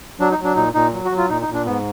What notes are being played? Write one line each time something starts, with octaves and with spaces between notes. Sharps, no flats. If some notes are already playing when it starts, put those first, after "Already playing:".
F#3 D4
D#4
F#3
D4
A#2 D#4
A#2 D#4
F#3
F#4
F#3
F4
A#2 D#4
D#4
A#2
D4
G#2 B3